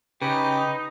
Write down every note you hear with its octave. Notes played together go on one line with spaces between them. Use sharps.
C#3 D#4 G4 B4 B5